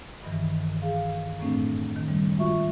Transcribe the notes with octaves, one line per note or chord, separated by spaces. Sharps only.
G2 D#3 E3
G#4 F5
F#2 A2 A3 C4 D4
D#3
C#3 G3
G#3 F4 F#4 E5 C#6